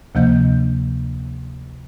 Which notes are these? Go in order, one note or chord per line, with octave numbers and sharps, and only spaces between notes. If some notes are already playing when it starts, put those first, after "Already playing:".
D2 C3 F3 A#3 D#5 G6